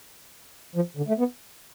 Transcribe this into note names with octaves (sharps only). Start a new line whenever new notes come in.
F3
D3
A3
B3